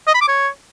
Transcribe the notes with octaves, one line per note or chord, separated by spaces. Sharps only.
D#5
B5
D6
C#5